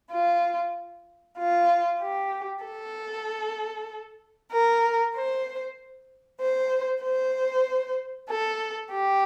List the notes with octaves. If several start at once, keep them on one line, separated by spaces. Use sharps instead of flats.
F4
F4
G4
A4
A#4
C5
C5
C5
A4
G4